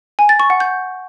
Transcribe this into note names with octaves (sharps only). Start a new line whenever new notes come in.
G#5
A6
C#6
F#5
G6